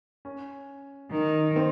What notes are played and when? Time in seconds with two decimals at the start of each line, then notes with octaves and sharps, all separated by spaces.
0.25 C#4
1.12 D#3
1.56 C4